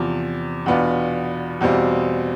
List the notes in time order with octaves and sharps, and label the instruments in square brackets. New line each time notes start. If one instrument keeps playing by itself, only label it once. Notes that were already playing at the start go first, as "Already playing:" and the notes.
Already playing: [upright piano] E2 C3 F3
E2 B2 B3 D4 F4
E2 B2 G3 C4 F4